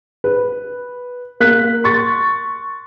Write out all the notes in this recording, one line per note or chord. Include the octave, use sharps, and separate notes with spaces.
B4
A#3 F#6 B6
C6 C#6 A6